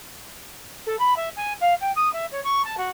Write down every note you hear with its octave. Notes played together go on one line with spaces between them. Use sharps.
A4
B5
E5
G#5
F5
G5
D#6
E5
C#5
C#6
A5
F#4